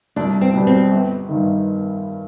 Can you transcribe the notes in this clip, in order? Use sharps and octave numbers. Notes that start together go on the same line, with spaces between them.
C2 D4
C4
B2 G3
C4
G1
G2 D#3